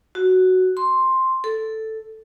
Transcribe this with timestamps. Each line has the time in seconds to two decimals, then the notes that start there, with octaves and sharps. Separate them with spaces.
0.15 F#4
0.77 C6
1.44 A4